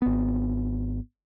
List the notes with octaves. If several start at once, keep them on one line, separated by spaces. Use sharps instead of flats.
G#1 B3